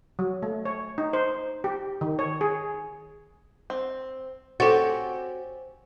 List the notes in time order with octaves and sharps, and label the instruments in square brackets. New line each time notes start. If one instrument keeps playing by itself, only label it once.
[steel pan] F#3
A3
C#5
D#4
C5
G4
D#3
C#5
G#4
[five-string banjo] C4
[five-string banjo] C4 C#4 G4 [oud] F#4 [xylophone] A4 A6